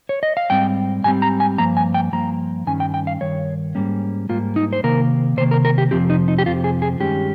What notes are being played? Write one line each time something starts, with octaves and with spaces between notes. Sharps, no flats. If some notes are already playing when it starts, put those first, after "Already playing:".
C#5
D#5
F5
G#2 G3 C4 G5
G#2 G3 C4 G#5
A#5
G#5
G2 F3 A#3 A#5
G#5
G5
G2 F3 A#3 A#5
G2 D#3 G3 C#4 G#5
G5
G5
F5
G2 D#3 C#5
G#2 G3 A#3 C#4
G#2 G3 A#3 F4
D#4
C5
C3 D#3 A#3 A#4
C3 D#3 A#3 C5
A#4
A#4
G4
F2 C3 F3 C4 G4
D#4
D#4
G4
F2 C3 F3 C4 F4
G#4
G#4
G2 D#3 G#3 C#4 G4